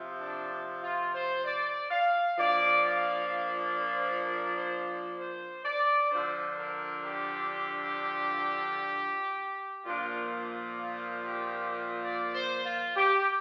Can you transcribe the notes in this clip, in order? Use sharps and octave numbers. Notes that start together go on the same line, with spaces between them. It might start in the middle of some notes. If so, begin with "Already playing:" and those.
Already playing: C3 F3
D4
F4
C5
D5
F5
F3 A#3 D4 D5
F5
C5
A#4
C5
C5
D5
D3 F3 D4 C5
A#4
G4
A#2 F3 A#3 D4 F4
D4
F4
G4
D5
C5
F4
G4